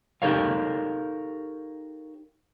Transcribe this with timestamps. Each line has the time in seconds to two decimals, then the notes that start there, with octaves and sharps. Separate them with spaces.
0.22 D#4 G4 A4 A#4 C#5 F5